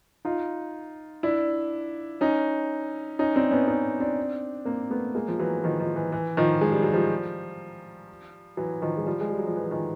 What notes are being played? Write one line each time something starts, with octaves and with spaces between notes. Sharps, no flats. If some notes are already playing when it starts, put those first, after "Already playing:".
D#4 F4
D4 E4
C#4 D#4
C#4 D#4
C4 D4
B3 C#4
C#4 D#4
C4 D4
A#3 C4
A3 B3
G#3 A#3
F3
E3 F#3
D#3 F3
D#3 F3
E3
E3
D#3 F3
G#3
G3
F#3
F3 G3
E3 F#3
D#3 F3
G#3
F3 G3
G#3
G3
F#3
F3
E3
D#3 F3